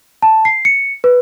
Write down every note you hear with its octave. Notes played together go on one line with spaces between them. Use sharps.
A5
C7
C#7
B4